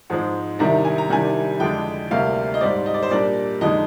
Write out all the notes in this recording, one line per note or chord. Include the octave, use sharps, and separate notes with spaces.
G#2 F3 G#3 C4
C2 C3 D#3 G3 D4 A#5
G#5
A#5
C2 C3 D#3 G3 D4 G#5
F2 D3 G#3 D4 G5
D2 C3 G3 A#3 F5
D#5
G#2 G3 C4 D5
D#5
D5
C5
A#2 G3 A#3 D4 D5
F2 D3 G#3 D#4 D#5